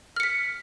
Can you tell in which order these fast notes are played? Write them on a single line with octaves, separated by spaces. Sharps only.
F6 C#7 B6